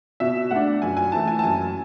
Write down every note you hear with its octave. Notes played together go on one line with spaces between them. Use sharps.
B2 E5
A3 D4 F#5
F#2 G#5
G#5
E3 A3 A5
G#5
A5
F#2 G#5